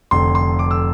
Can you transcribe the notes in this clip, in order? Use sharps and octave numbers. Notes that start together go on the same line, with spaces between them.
F1 F2 D3 C6
C6
D6
E6